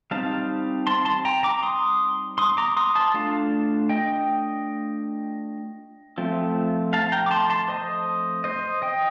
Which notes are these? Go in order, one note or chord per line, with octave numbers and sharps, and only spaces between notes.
G3 C4 D#4 F5 A5
A5 C6
A5 C6
G5 A#5
A#5 D6
C6 D#6
C6 D#6
A#5 D6
C6 D#6
A5 C6
A3 D4 F4 F5 A5
D#5 G5
F3 A3 C4 F4
F5 A5
G5 A#5
D6
A5 C6
A5 C6
C5 D#5
C5 D#5
D#5 G5